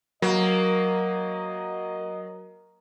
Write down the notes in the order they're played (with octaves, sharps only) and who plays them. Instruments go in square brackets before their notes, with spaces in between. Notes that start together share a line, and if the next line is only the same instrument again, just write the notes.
[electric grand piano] F#3 [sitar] A#3 [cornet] D#5